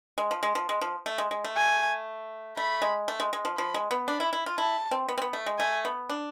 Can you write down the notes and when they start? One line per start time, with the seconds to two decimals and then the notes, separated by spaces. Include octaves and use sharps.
0.18 G#3
0.31 F3
0.43 G#3
0.55 F3
0.69 G#3
0.81 F3
1.06 A3
1.18 G#3
1.31 G#3
1.44 A3
1.57 G#5
2.57 A3 B5
2.82 G#3
3.08 A3
3.20 G#3
3.33 G#3
3.45 F3
3.57 F3 B5
3.74 G#3
3.91 B3
4.08 D4 B5
4.20 E4
4.33 E4
4.46 F4
4.58 E4 A5
4.91 C4
5.09 B3
5.18 C4
5.22 B3
5.33 A3
5.46 G#3
5.59 A3 G#5
5.85 B3
6.09 D4